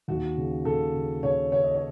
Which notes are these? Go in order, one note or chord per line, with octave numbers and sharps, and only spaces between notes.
D#2 F#4
C#3
C#3 A4
C#3
C#3 C#5
C#3 C#5
D#5
C#5